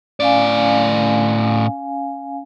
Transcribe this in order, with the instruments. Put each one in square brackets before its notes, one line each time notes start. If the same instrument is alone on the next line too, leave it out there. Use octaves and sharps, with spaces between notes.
[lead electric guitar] A2 D5 [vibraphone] C#4 F5 G#5